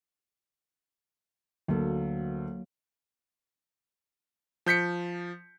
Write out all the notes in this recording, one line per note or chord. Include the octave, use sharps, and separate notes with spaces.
D2 F#3 A#3 A4
F3 G6 B6 C#7